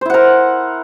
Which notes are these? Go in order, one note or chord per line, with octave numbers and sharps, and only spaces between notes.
E4 A#4 C5 F#5